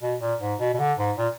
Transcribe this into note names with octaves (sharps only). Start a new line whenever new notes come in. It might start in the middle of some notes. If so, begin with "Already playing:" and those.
B2
A#2
G#2
B2
B2
D3
G#2
A#2